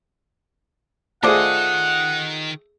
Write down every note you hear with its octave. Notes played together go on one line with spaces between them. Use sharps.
D#3 A3 F4 G#4 C5 D5 D#5 F#5